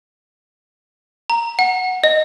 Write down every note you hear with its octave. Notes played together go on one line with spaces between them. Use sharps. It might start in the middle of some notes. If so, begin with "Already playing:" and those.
A#5
F#5
D#5